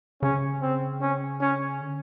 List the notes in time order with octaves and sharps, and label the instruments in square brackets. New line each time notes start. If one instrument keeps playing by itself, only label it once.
[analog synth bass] C#3 [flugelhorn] C#4
[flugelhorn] C4
C#4
C#4
[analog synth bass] D3